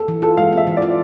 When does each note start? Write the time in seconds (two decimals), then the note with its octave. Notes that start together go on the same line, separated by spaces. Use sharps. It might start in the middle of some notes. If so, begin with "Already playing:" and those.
Already playing: A4
0.08 E3
0.22 F4 A4
0.37 G#3 F5
0.53 C4 E5
0.67 E3
0.77 D5
0.82 F4